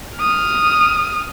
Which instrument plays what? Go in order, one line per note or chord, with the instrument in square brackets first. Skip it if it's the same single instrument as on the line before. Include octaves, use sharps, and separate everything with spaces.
[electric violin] D#6 F6